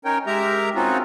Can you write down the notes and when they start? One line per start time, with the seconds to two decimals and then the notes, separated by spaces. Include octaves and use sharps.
0.05 C#4 D#4 A#4 C#5 G5
0.26 G#3 G4 A#4 E5 A#5
0.75 C4 C#4 D#4 F4 F#4